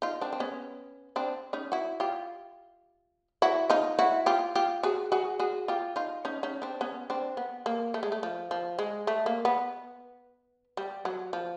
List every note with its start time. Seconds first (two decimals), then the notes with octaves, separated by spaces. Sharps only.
0.02 D#4 F4
0.21 C4 D4
0.32 C4
0.40 B3 C#4
1.16 C4 D4
1.53 C#4 D#4
1.72 E4 F#4
2.00 F4 G4
3.42 E4 F#4
3.70 D#4 F4
3.99 E4 F#4
4.26 F4 G4
4.55 F4 G4
4.83 F#4 G#4
5.12 F#4 G#4
5.39 F#4 G#4
5.68 F4 G4
5.96 D#4 F4
6.25 C#4 D#4
6.43 C#4 D#4
6.62 C4 D4
6.81 B3 C#4
7.10 C4 D4
7.37 B3
7.66 A#3
7.94 A3
8.03 G#3
8.12 A3
8.23 F3
8.51 F3
8.79 G#3
9.07 A3
9.26 A#3
9.45 B3
10.77 G3
11.05 F#3
11.33 F3